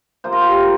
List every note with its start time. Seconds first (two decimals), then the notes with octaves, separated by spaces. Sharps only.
0.24 F3 A#3 F4 C5
0.33 A#4
0.41 G4
0.51 A#4